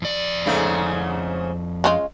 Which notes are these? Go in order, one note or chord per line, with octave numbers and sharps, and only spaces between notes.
F2 D5
G#2 C#3 A3
C#3 G#3 F4